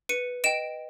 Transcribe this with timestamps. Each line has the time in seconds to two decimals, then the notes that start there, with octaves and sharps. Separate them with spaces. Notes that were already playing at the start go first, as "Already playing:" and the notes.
0.09 B4 C#7 D#7
0.44 D#5 G5 D7 E7